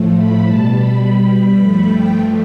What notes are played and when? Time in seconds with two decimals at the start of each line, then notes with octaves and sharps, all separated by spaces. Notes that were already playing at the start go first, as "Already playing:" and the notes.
Already playing: A2 F3 A3
0.15 B5
0.44 B2 G3 A5
0.73 B5
1.01 B5
1.58 G2 F3 A3
1.87 G5